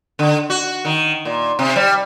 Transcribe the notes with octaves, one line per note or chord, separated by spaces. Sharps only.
D3
F#4
D#3
A#2
C3
G3